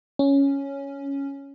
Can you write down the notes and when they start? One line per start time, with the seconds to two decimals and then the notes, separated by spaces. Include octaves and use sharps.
0.19 C#4